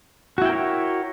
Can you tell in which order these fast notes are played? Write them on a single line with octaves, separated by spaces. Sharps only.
F#4 E4 G5 A#4 C#5